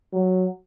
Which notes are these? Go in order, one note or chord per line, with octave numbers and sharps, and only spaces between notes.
F#3